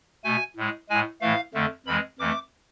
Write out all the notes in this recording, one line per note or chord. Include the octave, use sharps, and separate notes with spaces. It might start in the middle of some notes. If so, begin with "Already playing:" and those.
B2 A3 G#5
A2 G#3
A2 G#3 G#5
A2 E3 A3 F5
F2 D3 A3
F2 E3 G#3 B5
F2 E3 A3 D6